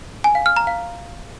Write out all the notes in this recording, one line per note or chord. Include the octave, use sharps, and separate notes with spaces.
G#5
F5
F6
A#5
F5